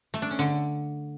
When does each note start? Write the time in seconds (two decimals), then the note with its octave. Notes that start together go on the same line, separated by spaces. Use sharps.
0.14 A3
0.22 D4
0.30 C#4
0.39 D3